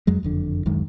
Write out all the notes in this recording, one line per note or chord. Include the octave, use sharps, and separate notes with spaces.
F2 F#3 G#3
F#1 F2 D3
D1 F#2 D#3 G#3